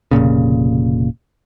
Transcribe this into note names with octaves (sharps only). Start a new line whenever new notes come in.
F1 B1 A#2 C#3